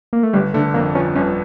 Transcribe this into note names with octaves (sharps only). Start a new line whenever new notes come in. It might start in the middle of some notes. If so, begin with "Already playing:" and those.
A#3
A3
G1 G3
D3 A3
F2 A#3
F3 C#4
G1 C#4